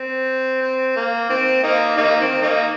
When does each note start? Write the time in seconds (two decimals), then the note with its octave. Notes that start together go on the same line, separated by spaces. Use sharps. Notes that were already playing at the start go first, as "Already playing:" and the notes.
Already playing: C4
0.62 C4
0.96 A#3
1.30 D#3 C4
1.64 A#3 D#4
1.97 A#3 D#4
2.20 D#3 C4
2.42 A#3 D#4